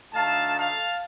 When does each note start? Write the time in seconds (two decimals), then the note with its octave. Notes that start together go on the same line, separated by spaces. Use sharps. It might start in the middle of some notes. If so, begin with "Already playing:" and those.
0.14 D2 D3 A3 D#4 F5 A5
0.57 F5 A5